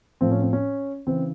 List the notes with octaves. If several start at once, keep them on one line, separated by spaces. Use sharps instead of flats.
A2 F3 C4
C#4
C4
C#4
C#3 E3 C4